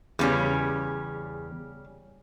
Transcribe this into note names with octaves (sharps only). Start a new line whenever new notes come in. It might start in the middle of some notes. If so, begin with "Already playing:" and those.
E2 C#3 G3 C#4